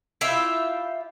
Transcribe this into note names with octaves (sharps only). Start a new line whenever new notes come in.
E4 F4 G4 E5